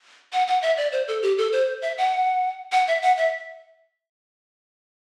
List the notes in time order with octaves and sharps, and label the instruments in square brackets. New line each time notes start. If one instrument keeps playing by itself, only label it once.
[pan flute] F#5
F#5
E5
D5
C5
A4
G4
A4
C5
E5
F#5
F#5
E5
F#5
E5